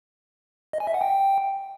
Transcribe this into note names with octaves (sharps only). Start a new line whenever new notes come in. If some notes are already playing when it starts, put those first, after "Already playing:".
D#5
G#5
E5
F#5
G5